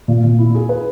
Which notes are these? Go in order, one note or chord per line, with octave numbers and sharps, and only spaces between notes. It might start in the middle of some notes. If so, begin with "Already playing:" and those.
A#2
A#2
E4
G#4
B4